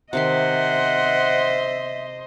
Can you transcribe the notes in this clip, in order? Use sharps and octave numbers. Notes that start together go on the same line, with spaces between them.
C3 D#3 C5 D#5 E5 F#5 C6